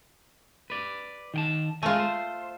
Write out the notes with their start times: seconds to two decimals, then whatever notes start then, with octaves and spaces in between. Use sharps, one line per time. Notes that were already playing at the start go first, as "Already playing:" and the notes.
0.70 B4 D5
1.34 D#3 G5 A5
1.83 G#3 A3 F4 A#4 G#5
1.99 C5